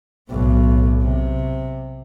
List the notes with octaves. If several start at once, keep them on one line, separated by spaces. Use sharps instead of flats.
B1 A2
C3